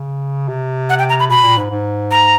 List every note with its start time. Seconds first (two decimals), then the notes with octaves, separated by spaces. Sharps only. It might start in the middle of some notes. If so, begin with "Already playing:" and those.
Already playing: C#3
0.48 C3
0.89 F#5
0.99 G5
1.10 A#5
1.20 B5
1.30 B2 B5
1.43 A#2
1.58 G#2
1.71 G#2
2.11 A#5